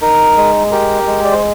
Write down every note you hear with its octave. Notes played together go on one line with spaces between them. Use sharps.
D#4 A#4
G#3
G4 A#4
G#3
D5
C5